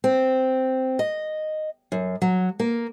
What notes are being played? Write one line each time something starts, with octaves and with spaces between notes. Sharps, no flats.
C4
D#5
F#2
F#3
A#3